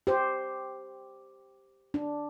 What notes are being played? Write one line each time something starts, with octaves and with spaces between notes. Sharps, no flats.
G4 C5
D4